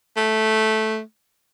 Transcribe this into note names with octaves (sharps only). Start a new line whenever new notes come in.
A3